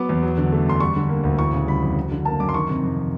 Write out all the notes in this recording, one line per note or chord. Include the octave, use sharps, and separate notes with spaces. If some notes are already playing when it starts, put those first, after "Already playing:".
Already playing: F#3 B3 D6
E2
F#3
D3
A3
F#2 C6
G3 C#6
D3
A#3
D2
E3 C#6
C#3
G3 B5
F2
F#3
D3
A#3 A5
F#2 D6
C6
D#3 C#6
C3
F2